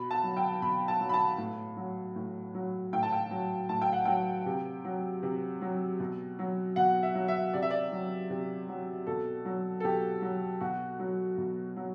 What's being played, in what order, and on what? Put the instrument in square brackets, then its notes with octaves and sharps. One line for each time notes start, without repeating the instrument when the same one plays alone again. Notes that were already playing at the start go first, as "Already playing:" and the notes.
Already playing: [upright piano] B2 B5
A5
F#3
G5
B2 B5
A5
F#3
B5
A5
A2
F#3
A2
F#3
A2 G5
A5
G5
F#3
A2 A5
G5
F#5
F#3 G5
C3
F#3
C3
F#3
B2
F#3
B2 F#5
E5
F#3
E5
C3 D5
E5
D5
F#3
C3
F#3
B2 A4
F#3
A4
B2 G4
F#3
B2 F#4
F#3
B2
F#3